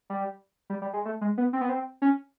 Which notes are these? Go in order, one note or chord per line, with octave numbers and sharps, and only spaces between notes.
G3
G3
G3
G#3
A3
G#3
B3
C4
B3
C4
C#4